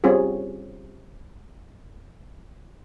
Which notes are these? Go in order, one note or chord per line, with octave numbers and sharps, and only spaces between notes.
G3 C4 C#4 F4 G#4